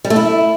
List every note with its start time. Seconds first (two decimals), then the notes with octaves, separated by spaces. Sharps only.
0.05 G3
0.10 A3
0.16 E4